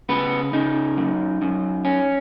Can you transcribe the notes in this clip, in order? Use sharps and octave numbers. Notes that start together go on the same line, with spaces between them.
C#3 B3 B4
C#3 D#4
F#2
F#2
C#4